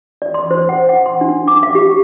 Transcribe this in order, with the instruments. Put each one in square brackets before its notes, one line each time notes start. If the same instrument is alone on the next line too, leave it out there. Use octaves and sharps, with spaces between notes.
[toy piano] D5
C6
C5
F#5
F#5
C6
D4
D6
F5
G4